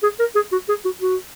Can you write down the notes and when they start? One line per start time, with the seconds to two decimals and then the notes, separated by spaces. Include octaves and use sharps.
0.03 G#4
0.19 A#4
0.35 G#4
0.52 F#4
0.69 G#4
0.85 F#4
1.01 F#4